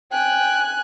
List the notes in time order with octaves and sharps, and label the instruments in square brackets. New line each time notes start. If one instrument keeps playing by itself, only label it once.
[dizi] G5 [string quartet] G#5 F#6